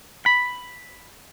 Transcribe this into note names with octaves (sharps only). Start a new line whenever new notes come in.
B5